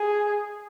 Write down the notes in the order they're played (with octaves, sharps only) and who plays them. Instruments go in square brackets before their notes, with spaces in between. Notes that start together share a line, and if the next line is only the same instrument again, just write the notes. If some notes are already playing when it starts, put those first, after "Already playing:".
Already playing: [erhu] G#4